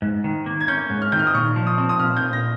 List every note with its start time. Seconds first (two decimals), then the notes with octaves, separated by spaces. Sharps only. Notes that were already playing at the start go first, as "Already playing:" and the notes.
0.02 G#2
0.24 D#3
0.46 A#3
0.61 G#6
0.68 C#4 G6
0.90 G#2
1.02 F6
1.12 D#3 G6
1.19 F6
1.27 D#6
1.34 A#2 C#6
1.56 F3
1.67 D#6
1.78 C4
1.89 D#6
1.99 A#2 F6
2.17 A#2 G6
2.33 A#6